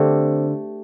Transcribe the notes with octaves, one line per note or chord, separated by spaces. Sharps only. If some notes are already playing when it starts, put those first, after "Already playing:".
Already playing: D3 A3 C4 G4